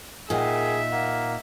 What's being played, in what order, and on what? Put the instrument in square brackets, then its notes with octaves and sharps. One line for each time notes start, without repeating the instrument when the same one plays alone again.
[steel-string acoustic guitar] A#2 D#4 [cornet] G#4 [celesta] A#4 F#5 G5 [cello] E5
[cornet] A#3 [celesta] F#5